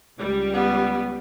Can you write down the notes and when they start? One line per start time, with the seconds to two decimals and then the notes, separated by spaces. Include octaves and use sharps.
0.18 C#2 G3
0.54 B3